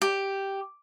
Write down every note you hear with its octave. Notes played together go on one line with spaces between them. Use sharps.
G4